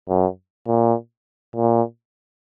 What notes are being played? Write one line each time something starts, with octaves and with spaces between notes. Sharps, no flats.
F#2
A#2
A#2